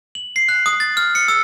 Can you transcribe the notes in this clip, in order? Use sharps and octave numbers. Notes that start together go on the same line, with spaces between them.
F#7
C7
F#6
D#6
A6
F6
C#7
E6